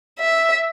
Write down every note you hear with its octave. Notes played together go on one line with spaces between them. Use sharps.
E5